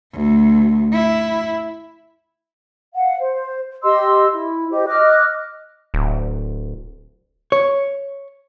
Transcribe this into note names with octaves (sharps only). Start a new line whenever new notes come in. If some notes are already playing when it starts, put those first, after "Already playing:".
D2
E4
F5 F#5
C5
G4 D#5 C6 E6
E4
G4 C5 D#5
D#5 D6 F6 F#6
D1
C#5